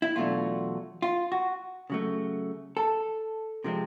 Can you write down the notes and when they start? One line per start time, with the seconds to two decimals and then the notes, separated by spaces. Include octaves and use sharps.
0.02 E4
0.15 E2 B2 F#3 A3 D4 F4
1.02 F4
1.32 F#4
1.90 C#3 F#3 A3
2.77 A4
3.64 C3 F3 G#3 C4